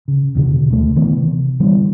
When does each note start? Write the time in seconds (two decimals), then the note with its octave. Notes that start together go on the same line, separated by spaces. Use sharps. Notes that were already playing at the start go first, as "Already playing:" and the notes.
0.08 C#3
0.35 E2 B2 D3
0.70 D2 A3
0.96 D#3 E3 B3
1.16 C3
1.60 D3 E3 G3 B3